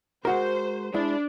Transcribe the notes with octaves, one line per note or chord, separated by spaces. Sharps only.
G#3 F#4 A#4 C5
G#3 D4 E4